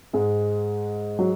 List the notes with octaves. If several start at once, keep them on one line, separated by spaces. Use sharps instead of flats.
G#2 G#3
F#3